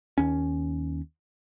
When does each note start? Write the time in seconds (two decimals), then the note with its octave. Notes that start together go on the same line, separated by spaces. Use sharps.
0.18 D#2 C#4